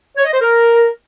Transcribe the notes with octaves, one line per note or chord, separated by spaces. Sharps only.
C#5
D#5
C5
A#4